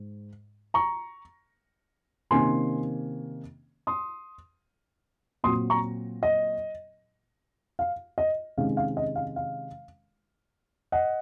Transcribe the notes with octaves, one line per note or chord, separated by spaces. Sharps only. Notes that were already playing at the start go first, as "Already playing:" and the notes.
Already playing: G#2
A#5 C#6
C3 D#3 A#3 C#4 G#5 C6
C6 D#6
A#2 F#3 C4 C6 D#6
A#5 C#6
D#5
F5
D#5
C3 D#3 G#3 C#4 F5
F5
D#5
F5
F5
D#5 F#5